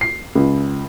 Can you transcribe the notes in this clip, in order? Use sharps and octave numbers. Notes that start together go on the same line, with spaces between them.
C7
C#2